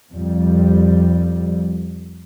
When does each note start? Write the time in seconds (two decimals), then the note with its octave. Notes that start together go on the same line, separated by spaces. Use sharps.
0.12 F2 G3